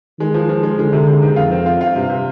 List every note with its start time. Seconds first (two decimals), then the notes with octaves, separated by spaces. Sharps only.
0.19 D#3 G#3
0.34 F3
0.49 F3
0.63 G#3
0.78 D3 G#3
0.93 C3
1.08 C3
1.22 D#3
1.36 F2 F4
1.51 C4
1.66 F4
1.81 F4
1.95 G2 C3
2.10 C3